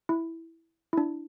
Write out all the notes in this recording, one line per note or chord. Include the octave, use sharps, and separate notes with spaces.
E4
E4
D4